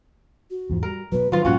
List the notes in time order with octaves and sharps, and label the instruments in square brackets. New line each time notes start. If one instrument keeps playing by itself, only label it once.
[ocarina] F#4
[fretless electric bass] E2 G#2 F3
[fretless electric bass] G3 [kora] A#4
[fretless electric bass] B2 F#3 [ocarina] B4
[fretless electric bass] D#3 F#3 D4 [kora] F3 F4 [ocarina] B4
[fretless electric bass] G2 A#2 F3 [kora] C#4 F4 F#4 [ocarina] F#5